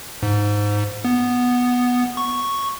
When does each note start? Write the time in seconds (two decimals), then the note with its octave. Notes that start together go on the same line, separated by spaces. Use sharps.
0.23 G#2
1.05 B3
2.17 C#6